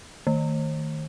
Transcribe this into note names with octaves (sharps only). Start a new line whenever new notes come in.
D#3